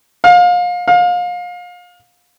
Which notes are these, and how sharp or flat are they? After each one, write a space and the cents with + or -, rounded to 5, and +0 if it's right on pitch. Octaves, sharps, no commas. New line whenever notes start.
F5 +30
F5 +30